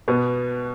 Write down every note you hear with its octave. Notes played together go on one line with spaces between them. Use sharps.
B2 B3